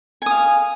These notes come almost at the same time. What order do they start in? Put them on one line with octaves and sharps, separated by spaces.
G#5 D#6 F5